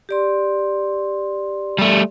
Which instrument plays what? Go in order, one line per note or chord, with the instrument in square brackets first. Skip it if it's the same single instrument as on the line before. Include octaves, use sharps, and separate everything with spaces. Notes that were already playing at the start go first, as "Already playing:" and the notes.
[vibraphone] G4 D5 C6
[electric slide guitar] G3 A3